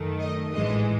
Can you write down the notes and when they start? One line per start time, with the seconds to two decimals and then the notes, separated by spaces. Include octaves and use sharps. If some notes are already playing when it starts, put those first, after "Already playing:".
Already playing: F#2 D#3 A3
0.21 D#5
0.52 A1 G#2 E3 G#3 D#5